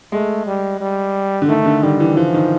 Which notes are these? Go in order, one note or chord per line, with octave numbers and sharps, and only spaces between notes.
G#3 A3
G3
G3
D3
D#3 A3
D3
D#3 G3
E3
E3 F3
D#3